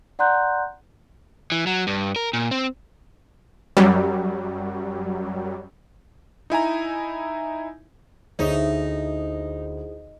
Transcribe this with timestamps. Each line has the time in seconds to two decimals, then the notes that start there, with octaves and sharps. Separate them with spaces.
0.19 D5 F#5 A#5 C6 F#6 G6
1.52 E3
1.67 F#3
1.87 G2
2.16 A#4
2.33 A#2
2.51 C4
3.77 F#2 F#3 G3
6.50 D#4 E4 G#5 A#5
8.39 D2 D#4 E4 G#4 C5 C#5 E5